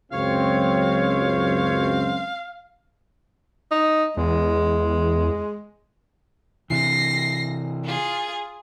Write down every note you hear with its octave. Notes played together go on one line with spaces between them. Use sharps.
C#2 F#2 C4 C#5 F5
D#4
E2 G#3
C3 E3 A#6 C7
F4 G#4